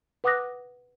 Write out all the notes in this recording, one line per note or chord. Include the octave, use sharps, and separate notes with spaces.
B4 F#5 D6 D#6 F#6 A#6